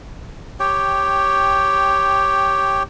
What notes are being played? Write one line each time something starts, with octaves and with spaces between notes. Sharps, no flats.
G4 C#5 G5